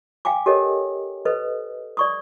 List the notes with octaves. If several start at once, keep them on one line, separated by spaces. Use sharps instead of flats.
F5 G5 G#5 D6
G4 A4 A#4 C#5 D#5
A4 B4 C5 D#5
D5 C#6 D#6